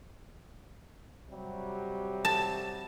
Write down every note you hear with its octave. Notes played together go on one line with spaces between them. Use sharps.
C3 F#3 G3
A5